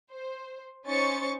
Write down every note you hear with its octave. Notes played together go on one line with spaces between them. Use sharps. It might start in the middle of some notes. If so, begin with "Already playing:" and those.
C5
C#4 D#4 C5 C#6 A6 C#7